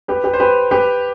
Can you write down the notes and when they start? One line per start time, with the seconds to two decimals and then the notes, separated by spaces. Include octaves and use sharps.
0.08 G4 B4
0.24 G4 B4
0.33 C5
0.40 G4 B4
0.71 G4 B4